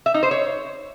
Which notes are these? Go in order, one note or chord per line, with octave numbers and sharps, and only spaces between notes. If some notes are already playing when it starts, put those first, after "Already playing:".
E5
D#4
C5
C#5